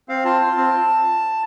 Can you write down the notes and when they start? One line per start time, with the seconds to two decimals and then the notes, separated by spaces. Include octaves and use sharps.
0.09 C4 F5
0.25 F4 A5
0.42 F4
0.57 C4